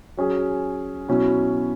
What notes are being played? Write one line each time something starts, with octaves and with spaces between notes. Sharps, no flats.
F#3 C#4 G#4
B2 F#3 C#4 E4